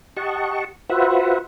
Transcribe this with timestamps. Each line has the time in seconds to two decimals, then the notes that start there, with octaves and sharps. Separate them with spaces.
0.17 G4 D#5 F#5 A5 C#6
0.90 F4 F#4 B4 C5 E5 F#5